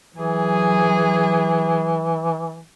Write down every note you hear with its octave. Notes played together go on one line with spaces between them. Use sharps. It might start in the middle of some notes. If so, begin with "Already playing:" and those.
E3 F#3 G#4